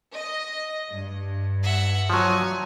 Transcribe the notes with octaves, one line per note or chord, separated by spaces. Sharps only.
D#5
G2
E5 F#5
F3 F#3 C#5 G#5